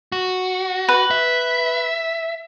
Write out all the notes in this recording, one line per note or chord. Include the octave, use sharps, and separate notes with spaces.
F#4
B4
E5